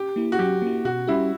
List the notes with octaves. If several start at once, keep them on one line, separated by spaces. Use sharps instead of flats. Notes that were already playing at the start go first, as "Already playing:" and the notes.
Already playing: G4
A#3 E4
F#4
F#3 G4
A#3 E4
B2 F#4
G3 C#4 E4 G4